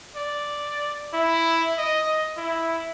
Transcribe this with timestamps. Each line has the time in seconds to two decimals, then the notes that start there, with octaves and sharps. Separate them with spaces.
0.16 D5
1.14 E4
1.78 D#5
2.37 E4